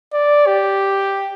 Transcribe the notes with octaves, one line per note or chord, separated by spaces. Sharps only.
D5
G4